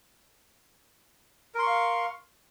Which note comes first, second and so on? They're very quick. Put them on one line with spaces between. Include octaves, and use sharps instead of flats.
A#4 C6 C#6 F5